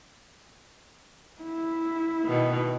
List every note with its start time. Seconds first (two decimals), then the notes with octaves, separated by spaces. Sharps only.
1.42 E4
2.24 B2 D#3